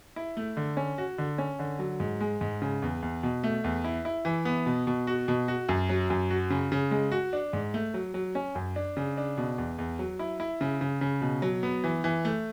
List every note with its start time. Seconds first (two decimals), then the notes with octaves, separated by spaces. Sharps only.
0.16 E4
0.37 A3
0.57 D3
0.77 C#4
0.98 F#4
1.18 D3
1.38 C#4
1.59 D3
1.79 F#3
2.00 G#2
2.21 G#3
2.41 G#2
2.62 C#3
2.82 E2
3.02 E2
3.23 B2
3.43 A3
3.64 E2
3.84 E4
4.05 E4
4.25 E3
4.45 B3
4.66 B2
4.87 B2
5.07 F#4
5.28 B2
5.48 F#4
5.69 F#2
5.89 F#3
6.10 F#2
6.30 F#4
6.50 C#3
6.72 C#3
6.91 G#3
7.12 F#4
7.33 D4
7.53 G#2
7.74 A3
7.94 F#3
8.14 F#3
8.35 C#4
8.55 F#2
8.76 D4
8.97 C#3
9.18 D4
9.38 B2
9.58 E2
9.78 E2
9.99 F#3
10.19 E4
10.40 E4
10.61 C#3
10.81 C#3
11.01 C#3
11.21 B2
11.42 F#3
11.63 B3
11.84 E3
12.04 E3
12.25 A3